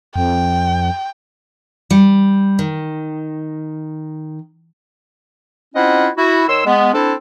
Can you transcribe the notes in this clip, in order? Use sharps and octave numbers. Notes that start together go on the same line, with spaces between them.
F2 G5
G3
D#3
C4 C#4 E4 F4 D#5 F#5
E4 F#4
D#3 C#5 C6 E6
G#3 B3
C4 D4 E4 A4